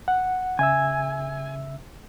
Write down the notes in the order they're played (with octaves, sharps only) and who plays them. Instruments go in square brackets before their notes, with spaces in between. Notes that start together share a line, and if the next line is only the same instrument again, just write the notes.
[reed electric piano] F#5
[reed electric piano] C#3 E5 E6 [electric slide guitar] G#5